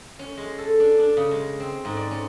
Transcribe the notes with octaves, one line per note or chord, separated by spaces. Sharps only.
C#4
G#3
A4
D4
D4
C#3
G#3
C4
G#2
D5
C#4